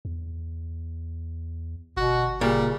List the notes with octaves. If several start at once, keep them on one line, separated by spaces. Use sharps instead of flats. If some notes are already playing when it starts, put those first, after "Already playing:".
E2
G1 B2 F#4
A#2 C#3 G3